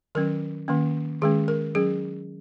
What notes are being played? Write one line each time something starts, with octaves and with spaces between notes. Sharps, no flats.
D#3 F#3 C#4 A#4
D#3 A#3 C#4
D#3 G#3 C#4 G#4
A#4
F#3 C#4 G#4